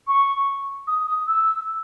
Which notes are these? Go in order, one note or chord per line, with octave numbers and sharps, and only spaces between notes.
C#6
D#6
D#6
E6